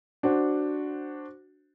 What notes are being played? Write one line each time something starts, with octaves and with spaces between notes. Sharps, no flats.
D4 F#4 C5